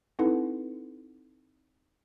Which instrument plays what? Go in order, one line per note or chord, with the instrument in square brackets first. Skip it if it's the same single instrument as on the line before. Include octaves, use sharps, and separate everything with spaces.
[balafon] C4 D#4 E4 A4 B4 F#5